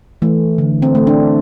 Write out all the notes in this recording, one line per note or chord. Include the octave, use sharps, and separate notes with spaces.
E3 A3
D3
C4
A3
D4